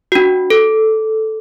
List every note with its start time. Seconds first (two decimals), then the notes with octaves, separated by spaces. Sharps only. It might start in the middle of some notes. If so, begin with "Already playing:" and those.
0.12 D4 F#4
0.50 A4